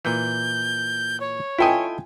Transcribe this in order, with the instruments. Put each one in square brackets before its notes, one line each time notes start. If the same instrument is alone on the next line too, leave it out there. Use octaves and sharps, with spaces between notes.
[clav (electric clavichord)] A#2 E3 [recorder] G6
[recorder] C#5
[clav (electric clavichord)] E4 A4 D#5 [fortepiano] F4 G5 G#5